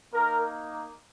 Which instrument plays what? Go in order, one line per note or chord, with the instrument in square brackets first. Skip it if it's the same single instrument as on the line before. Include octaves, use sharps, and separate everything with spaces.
[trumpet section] A#3 D#4 A#4